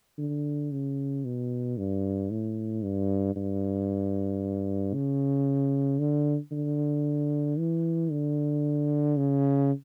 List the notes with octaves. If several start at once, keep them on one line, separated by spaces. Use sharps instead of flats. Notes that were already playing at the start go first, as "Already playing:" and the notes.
D3
C#3
B2
G2
A2
G2
G2
C#3
D3
D3
E3
D3
C#3